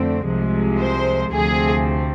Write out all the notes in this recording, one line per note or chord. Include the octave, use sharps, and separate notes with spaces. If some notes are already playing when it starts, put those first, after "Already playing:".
Already playing: F2 D3 A3 C4
C2 C3 F3 G#3
C5
D2 C3 F3 A3 C4 G#4